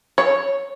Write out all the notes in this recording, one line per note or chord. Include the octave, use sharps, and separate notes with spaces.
C#5